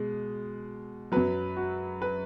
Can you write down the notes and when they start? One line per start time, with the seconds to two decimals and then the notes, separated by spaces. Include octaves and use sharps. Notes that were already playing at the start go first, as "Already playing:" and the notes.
Already playing: B2 G#3
1.12 F#2 F#3 B4
1.57 F#4
2.02 B4